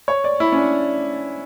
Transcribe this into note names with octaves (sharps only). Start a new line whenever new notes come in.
C#5
D5
E4
C#4
D4